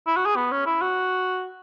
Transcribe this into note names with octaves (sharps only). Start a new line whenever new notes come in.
E4
F#4
G#4
B3
C#4
E4
F#4